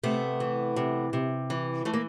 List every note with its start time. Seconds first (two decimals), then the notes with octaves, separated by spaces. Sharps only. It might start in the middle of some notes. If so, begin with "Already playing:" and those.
0.03 C3 A3 B3
0.40 E3
0.76 C3
1.13 C3
1.50 E3
1.85 E3 A3
1.94 A#3